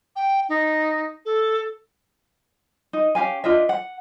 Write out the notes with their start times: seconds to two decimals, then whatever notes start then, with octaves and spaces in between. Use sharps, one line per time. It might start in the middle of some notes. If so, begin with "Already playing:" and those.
0.16 G5
0.49 D#4
1.25 A4
2.93 D#4
3.15 C#4 G4 F5 G#5
3.44 D4 F4 D#5 E5
3.69 F#5